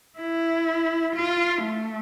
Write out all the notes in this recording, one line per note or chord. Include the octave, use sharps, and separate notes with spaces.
E4
F4
A3